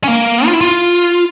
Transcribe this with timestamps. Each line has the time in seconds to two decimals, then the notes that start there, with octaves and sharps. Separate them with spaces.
0.04 C#4
0.08 A#3
0.46 F4
0.53 E4
0.61 F4